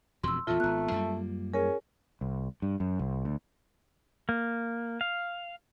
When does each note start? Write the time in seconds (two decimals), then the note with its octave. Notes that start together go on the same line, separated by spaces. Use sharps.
0.23 E1 F2 B2 C6 E6
0.47 E2 A#2 A3 F4
0.60 G#1 B3 A#5 F#6
0.91 F#2 G3 A#3
1.54 C#4 G#4 A#4
2.21 C2
2.62 G2
2.80 F#2
2.99 C2
3.25 D2
4.29 A#3
5.01 F5